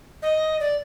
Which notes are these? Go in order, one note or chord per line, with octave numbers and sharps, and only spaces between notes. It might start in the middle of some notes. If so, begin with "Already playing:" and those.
D#5
D5